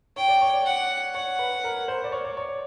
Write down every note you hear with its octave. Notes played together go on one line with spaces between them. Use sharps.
C#5 G5
D5
C#5
D5
F#5
C#5 F#5
B4
A#4
C5
D5
C#5
D5
C#5